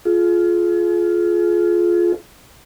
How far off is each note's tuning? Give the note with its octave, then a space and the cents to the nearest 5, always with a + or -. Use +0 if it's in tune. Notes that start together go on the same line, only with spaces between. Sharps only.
F4 +0 G#4 +40